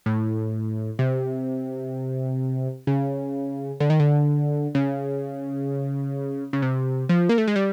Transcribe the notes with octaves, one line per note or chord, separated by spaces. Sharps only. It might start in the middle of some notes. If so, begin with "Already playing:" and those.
A2
C3
C#3
D3
D#3
D3
C#3
C#3
C3
F3
A#3
A3
G#3
G3